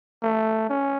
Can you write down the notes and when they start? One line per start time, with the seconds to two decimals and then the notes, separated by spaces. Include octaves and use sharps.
0.23 A3
0.69 C#4